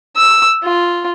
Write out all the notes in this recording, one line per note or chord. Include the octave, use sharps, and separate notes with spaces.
E6
F4